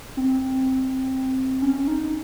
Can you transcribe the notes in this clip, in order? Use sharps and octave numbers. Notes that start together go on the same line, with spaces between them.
C4
C#4
D#4